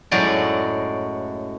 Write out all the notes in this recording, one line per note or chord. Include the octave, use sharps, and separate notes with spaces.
F#2 A2 F#3 G#3 A3 D5